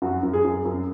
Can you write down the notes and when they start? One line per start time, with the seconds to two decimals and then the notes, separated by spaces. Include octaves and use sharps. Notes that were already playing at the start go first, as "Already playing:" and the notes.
0.02 F#2 F#4
0.23 F#2
0.33 G#4
0.45 F#2
0.65 F#2